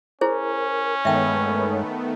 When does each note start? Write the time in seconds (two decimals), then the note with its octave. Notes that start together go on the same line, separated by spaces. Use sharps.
0.21 C#4 E4 G#4 A#4 C5
1.05 G2 D#3 G#3 A3 B3 C#5 E5 G5